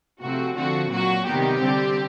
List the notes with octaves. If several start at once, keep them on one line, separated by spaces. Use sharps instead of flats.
C3 F3 A3 C4 F#4
D3 F3 A3 C4 F#4
A#2 F#3 A#3 F#4
C3 D#3 G3 B3 G4
D3 G3 C4